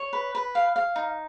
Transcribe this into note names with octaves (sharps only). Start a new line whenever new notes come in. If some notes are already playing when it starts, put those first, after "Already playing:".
Already playing: C#5
B4
B4
F5
F5
D#4